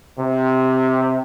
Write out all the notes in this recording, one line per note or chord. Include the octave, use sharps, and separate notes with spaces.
C3